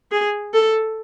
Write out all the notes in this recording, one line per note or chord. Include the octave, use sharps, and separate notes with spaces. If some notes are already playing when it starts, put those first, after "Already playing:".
G#4
A4